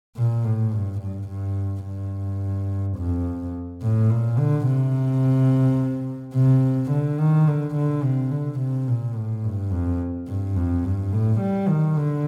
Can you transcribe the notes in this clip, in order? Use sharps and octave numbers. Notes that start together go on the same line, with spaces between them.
A#2
A2
G2
G2
G2
G2
F2
A2
A#2
D3
C3
C3
D3
D#3
D3
D3
C3
D3
C3
A#2
A2
G2
F2
G2
F2
G2
A2
G3
D#3
D3